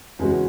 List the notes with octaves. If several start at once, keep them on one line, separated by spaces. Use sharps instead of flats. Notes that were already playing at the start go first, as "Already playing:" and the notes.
E2 C#3 G#3 C#4 F#4